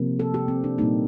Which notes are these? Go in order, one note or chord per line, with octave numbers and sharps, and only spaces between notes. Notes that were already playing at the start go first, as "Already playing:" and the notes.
Already playing: C3 F3 A#3
A4
G4
C4
D4
A#2 G3 A#3 D#4